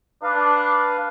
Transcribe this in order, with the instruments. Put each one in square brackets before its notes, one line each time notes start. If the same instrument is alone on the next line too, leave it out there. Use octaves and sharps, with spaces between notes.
[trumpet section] D4 [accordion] B4 F5